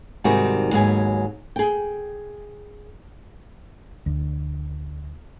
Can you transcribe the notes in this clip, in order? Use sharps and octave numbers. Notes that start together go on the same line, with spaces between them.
G#2 C3 D#3 G3 F#4 G#4
D#2 G#2 F#3 B3 G#4 G#5
G#4 G5
D2